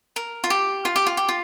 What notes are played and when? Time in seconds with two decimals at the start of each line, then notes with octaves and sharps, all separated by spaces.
0.16 A#4
0.44 F4
0.50 G4
0.85 F4
0.96 G4
1.07 F4
1.17 G4
1.29 F4